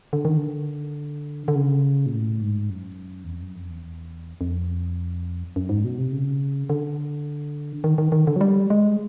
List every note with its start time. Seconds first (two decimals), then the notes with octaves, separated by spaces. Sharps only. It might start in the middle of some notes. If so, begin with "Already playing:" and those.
0.13 D3
0.25 D#3
0.37 D3
1.48 D3
1.56 C#3
2.06 A#2
2.13 A2
2.41 G#2
2.70 F#2
3.24 E2
3.33 F2
3.42 F#2
3.56 F2
3.70 E2
4.41 F2
5.56 F#2
5.69 G#2
5.84 B2
5.98 C3
6.13 C#3
6.70 D3
7.84 D#3
7.98 D#3
8.12 D#3
8.27 D3
8.36 F#3
8.41 G3
8.70 G#3